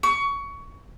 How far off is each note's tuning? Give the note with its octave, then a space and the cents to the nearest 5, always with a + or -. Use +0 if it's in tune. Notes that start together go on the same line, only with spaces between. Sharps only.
C#6 +20